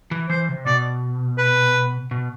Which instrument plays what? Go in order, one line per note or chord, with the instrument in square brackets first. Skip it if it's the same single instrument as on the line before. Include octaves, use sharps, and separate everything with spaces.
[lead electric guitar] E3
[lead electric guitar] E3 [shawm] C5
[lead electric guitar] C3
[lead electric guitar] B2 [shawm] D5
[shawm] B4
[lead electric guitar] B2